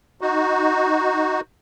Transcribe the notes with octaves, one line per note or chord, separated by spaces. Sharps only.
D#4 F#4